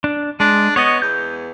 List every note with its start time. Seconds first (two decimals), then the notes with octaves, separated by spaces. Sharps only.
0.04 D4
0.40 G#3 D4
0.76 B3 C#5 D#5
1.02 E2 G6